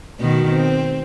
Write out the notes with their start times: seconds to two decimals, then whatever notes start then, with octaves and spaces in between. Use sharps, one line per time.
0.19 B2 D#3 F#4
0.53 C4